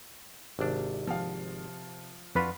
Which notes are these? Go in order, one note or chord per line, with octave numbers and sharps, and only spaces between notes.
G#1 C3 D4
F3 F5
F2 D4 F4 F#4 B4 B5